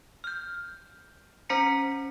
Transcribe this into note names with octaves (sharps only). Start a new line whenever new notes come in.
F6 G6
C#4 C5 A#5 B6 C#7